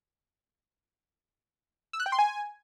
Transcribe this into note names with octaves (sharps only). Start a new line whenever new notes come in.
E6
F#6
G5
C6
G#5